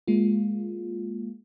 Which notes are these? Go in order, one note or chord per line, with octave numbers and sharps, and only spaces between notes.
G#3 A#3 F4